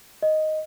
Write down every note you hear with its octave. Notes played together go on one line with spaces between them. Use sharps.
D#5